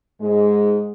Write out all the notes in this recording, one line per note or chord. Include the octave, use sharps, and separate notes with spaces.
G#2 G#3